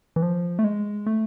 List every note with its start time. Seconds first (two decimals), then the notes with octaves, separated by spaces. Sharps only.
0.16 E3
0.22 F3
0.59 A3
0.64 G#3
1.06 A3